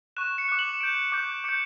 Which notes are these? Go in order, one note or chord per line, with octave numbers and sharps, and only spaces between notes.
C#6 F#6 E7
C#7
D6 F#6 E7
F#7
E7
D6 G6 D7
D6 G6
D6 G6 C#7